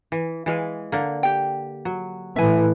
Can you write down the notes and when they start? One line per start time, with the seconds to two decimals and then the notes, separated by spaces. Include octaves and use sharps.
0.12 E3
0.46 E3 G#3 F5
0.92 D3 A#3
1.23 G4 G5
1.85 F#3
2.36 A2 E3 E5 G#5